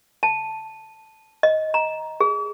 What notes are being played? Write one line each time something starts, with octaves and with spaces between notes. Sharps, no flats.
A5
D#5
A#5
G#4